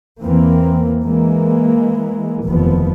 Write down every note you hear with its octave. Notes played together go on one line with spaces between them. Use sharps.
E2 E3 A#3 C4
E3 G#3 A#3
F1 D#2 E3 F3 B3